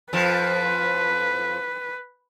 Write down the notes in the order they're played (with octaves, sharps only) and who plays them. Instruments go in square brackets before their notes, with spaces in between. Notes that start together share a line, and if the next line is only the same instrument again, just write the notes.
[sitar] F2 F3 [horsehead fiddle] B4